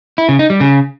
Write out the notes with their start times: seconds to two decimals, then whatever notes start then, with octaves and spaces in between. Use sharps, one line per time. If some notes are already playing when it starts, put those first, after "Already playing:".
0.18 E4
0.29 C#3
0.39 D#4
0.50 G3
0.60 C#3